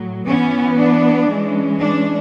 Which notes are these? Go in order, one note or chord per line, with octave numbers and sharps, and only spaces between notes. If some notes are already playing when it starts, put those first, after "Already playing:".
Already playing: A2 F#3
E3 B3 C#4
D4
E3 G#3 C#4
D4